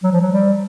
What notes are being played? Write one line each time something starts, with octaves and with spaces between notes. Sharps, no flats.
F#3
F3
F#3
G3